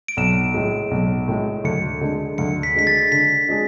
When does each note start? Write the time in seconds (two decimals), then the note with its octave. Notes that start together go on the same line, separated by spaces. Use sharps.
0.08 D7
0.17 B1 E7
0.54 A2 G#3
0.91 B1
1.28 A2 G#3
1.64 D2 C#7
2.01 D3 G#3
2.38 D2 C#7
2.63 B6
2.75 D3 G#3 B6
2.87 A6
3.12 D3 B6
3.49 G#3 D4 G#4